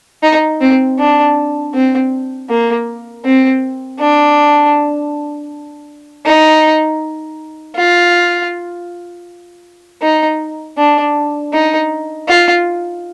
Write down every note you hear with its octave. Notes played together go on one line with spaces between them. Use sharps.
D#4
C4
D4
C4
A#3
C4
D4
D#4
F4
D#4
D4
D#4
F4